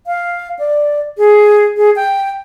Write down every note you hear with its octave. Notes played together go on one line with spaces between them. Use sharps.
F5
D5
G#4
G#4
G5